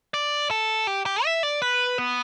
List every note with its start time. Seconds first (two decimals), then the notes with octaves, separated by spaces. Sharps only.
0.14 D5
0.51 A4
0.87 G4
1.06 G4
1.25 E5
1.43 D5
1.62 B4
1.98 B3